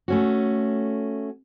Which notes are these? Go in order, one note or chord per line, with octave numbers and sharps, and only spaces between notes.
A3 C#4 F#4